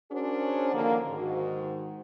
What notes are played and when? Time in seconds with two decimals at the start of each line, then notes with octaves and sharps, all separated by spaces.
0.11 C#4 D4 F#4 G#4 A#4 C5
0.73 D3 D#3 F3 A#3
1.08 G#2 D#3 F#4